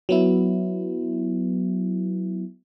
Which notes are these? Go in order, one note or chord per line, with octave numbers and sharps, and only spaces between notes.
F#3 B3 E4